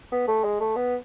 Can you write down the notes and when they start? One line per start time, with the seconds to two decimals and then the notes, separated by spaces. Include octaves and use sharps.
0.12 B3
0.28 A3
0.44 G#3
0.60 A3
0.76 B3